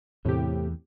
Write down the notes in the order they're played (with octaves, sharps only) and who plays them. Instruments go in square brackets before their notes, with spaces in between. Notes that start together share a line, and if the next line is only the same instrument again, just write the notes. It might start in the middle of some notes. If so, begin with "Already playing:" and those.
[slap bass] E2 [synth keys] A2 C3 G4